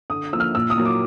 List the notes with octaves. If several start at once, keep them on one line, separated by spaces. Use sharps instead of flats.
D3 D#6
F3 A#3 E6
F6
A#2 E6
D#6
F#3 A#3
D6